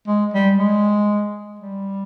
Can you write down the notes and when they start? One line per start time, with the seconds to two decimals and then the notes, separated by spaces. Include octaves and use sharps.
0.08 G#3
0.33 G3
0.58 G#3
1.59 G3